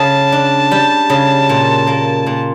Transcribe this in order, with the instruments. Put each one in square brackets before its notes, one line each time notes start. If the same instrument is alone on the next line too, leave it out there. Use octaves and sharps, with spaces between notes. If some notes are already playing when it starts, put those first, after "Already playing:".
Already playing: [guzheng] C#3 [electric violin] A5
[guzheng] D4
G3
C#3
A#2
A#3
A#2